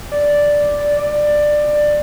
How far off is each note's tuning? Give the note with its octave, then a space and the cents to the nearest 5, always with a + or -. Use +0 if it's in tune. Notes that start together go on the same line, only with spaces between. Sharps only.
D5 -5
D5 +15